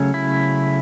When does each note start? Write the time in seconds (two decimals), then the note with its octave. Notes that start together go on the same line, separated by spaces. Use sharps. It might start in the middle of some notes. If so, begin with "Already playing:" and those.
Already playing: C#3 F#3 A3 C#4
0.14 E4